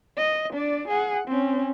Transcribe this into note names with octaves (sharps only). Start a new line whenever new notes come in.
D#5
D4 D5
G#4 F#5
C4 C#4